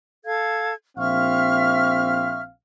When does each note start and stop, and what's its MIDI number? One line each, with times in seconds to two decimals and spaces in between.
0.25 0.74 69
0.25 0.74 77
0.25 0.74 92
0.98 2.51 34
0.98 2.51 60
0.98 2.40 76
0.98 2.51 77
0.98 2.40 85
0.98 2.40 89